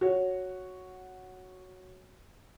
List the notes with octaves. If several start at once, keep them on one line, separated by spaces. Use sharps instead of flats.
F#4 C#5